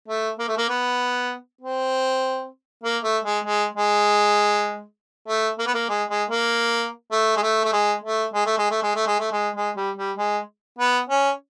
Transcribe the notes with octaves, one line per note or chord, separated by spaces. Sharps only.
A3
A#3
A3
A#3
B3
C4
A#3
A3
G#3
G#3
G#3
A3
A#3
B3
A#3
G#3
G#3
A#3
A3
G#3
A3
A3
G#3
A3
G#3
A3
G#3
A3
G#3
A3
G#3
A3
G#3
G#3
G3
G3
G#3
B3
C#4